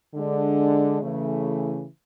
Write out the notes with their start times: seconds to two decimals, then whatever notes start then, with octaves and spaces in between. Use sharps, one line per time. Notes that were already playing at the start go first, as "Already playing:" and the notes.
0.14 D3 G#3 D4
1.00 C#3 E3 A3